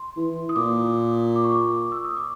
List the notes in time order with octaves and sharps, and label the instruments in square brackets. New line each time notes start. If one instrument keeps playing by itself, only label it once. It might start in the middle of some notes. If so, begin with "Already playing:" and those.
Already playing: [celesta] C6
[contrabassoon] E3
[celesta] D#6
[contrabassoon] A#2 [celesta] D6
[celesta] D6
C#6
D6
E6
D#6
D6